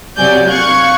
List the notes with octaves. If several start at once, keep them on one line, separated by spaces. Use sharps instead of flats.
C3 F#3 D5 G#5 G6
F5 C#6 F#6 G#6